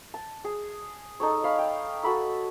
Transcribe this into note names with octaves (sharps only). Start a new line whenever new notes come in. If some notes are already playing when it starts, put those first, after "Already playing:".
A5
G#4
D#4 A4 C#5
C#5 F5 B5
G5
F#4 A4 B5 E6